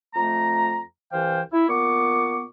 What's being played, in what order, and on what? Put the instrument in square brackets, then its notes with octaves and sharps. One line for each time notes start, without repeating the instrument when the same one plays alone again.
[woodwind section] F2 A3 A#5
C2 E3 C5 F5 G5
E4
A#2 B3 C#6 D6